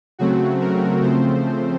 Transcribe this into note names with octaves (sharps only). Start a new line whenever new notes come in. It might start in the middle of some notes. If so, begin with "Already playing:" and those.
C#3 F#3 A3 C4 F#4
A#4
C#3 F3 A3 C4 C5